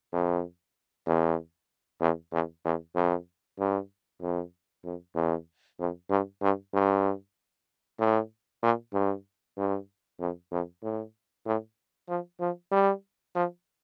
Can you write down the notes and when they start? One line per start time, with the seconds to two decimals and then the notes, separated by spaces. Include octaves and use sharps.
0.13 F2
1.07 E2
2.01 E2
2.32 E2
2.65 E2
2.96 F2
3.59 G2
4.21 F2
4.85 F2
5.16 E2
5.80 F2
6.10 G2
6.42 G2
6.74 G2
8.00 A2
8.63 A#2
8.93 G2
9.57 G2
10.20 F2
10.51 F2
10.83 A2
11.46 A2
12.09 F3
12.40 F3
12.72 G3
13.35 F3